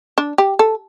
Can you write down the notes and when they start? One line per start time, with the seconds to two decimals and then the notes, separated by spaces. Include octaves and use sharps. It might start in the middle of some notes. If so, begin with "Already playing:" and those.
0.18 D4
0.38 G4
0.59 A4